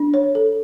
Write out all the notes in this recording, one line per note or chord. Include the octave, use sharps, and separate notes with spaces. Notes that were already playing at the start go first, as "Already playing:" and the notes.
Already playing: D4
C#5
A4